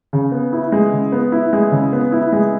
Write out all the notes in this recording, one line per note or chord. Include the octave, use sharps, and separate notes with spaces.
C#3
B3
E4
G#3
C#3
B3
E4
G#3
C#3
B3
E4
G#3